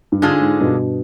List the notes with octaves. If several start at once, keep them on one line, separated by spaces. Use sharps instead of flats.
G2
G#2 D3 G#3 D4 F4 G#4
G#2
G2 B2